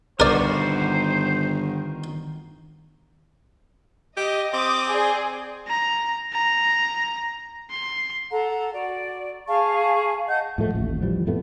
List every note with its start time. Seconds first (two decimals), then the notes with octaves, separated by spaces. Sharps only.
0.20 G1 D#3 F#4 A#4 C5 D5
4.17 G4 D#5
4.54 C4 D6 D#6
4.91 G#4 D5
5.68 A#5
6.33 A#5
7.71 C6
8.31 A4 F#5 A#5
8.73 F#4 D5
9.48 G#4 F5 A5 C#6
10.28 D#5 F#5 A5 G6
10.58 A2 F3 A3
10.75 A1 D#2
11.01 A2 E3 F3 G3
11.26 F2 A2 A3 B3